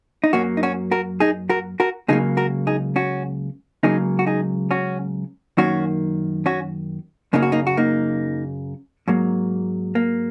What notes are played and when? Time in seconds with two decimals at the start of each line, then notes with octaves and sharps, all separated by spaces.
0.24 D#4
0.33 F#2 F#3 A#3 C#4 F#4
0.57 D#4
0.63 C#4 F#4
0.91 F#4 A#4
1.20 D#4 G#4
1.50 F#4 A#4
1.80 F#4 A#4
2.08 C#2 C#3 F#3 A#3 D#4 G#4
2.37 F#4 A#4
2.67 D#4 G#4
2.96 C#4 F#4
3.83 C#2 C#3 F#3 A#3 D#4 G#4
4.19 F#4
4.26 D#4 G#4
4.71 C#4 F#4
5.57 F#2 D#3 A#3 C#4 F#4
6.46 C#4 F#4
7.33 F#2 C#3 F#3 A#3 D#4
7.42 F#4
7.52 A#3 D#4
7.67 F#4
7.77 A#3 D#4
9.08 G#2 F#3 A#3
9.95 A#3